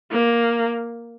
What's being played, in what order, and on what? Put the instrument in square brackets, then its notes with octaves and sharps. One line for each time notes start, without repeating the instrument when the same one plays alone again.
[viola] A#3